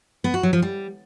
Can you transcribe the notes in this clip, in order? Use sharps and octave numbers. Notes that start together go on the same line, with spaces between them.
B3
F#4
F#3
F3
G3